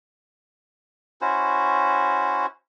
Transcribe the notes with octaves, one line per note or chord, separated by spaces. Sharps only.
C#4 E4 F#4 C5